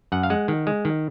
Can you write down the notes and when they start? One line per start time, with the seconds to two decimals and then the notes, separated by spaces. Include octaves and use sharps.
0.12 F#2 F#5
0.23 F5
0.30 G#3 F#5
0.48 D#3
0.67 G#3
0.85 D#3